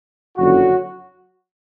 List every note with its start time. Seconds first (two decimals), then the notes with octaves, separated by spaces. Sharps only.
0.37 F#1 F2 D3 F#3 F#4